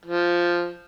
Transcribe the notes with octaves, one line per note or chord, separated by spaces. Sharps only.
F3